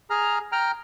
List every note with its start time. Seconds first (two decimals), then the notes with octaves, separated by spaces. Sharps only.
0.10 G#4 A#5 F6
0.52 G5 A#5 F6